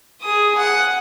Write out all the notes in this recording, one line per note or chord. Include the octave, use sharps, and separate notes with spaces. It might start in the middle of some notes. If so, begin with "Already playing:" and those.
G#4 D#6
F#5